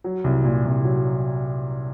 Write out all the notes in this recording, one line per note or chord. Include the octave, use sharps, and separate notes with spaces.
F#3
C2
A#2
C2
F#3